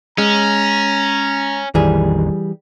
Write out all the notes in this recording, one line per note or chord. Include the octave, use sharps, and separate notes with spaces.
G#3 C#4 A#5
A#1 F2 D#3 E3 G3 G#4